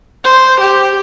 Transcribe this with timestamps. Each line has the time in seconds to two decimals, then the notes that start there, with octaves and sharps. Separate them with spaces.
0.25 C5
0.61 G4